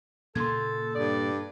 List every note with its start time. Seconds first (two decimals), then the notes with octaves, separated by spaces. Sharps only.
0.35 A#2 C#3 A#3 A4 C6 G#6
0.95 G2 A4 D5